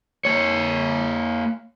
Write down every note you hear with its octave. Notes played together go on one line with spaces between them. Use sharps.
A#3 C#5